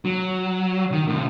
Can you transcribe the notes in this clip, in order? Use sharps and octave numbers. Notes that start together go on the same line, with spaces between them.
F#3
D#3
A2 C3